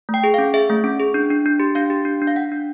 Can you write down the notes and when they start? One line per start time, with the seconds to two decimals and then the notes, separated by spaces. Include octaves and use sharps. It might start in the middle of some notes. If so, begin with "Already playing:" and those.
0.09 A3
0.14 G5
0.24 G#4
0.34 C#4 F5
0.54 G#4 E5
0.70 A3
0.84 C#4
1.00 G#4
1.14 D4
1.30 D4
1.46 D4
1.60 G4
1.75 D4 F5
1.90 G4
2.05 D4
2.22 D4
2.27 F5
2.36 D4 F#5
2.52 D4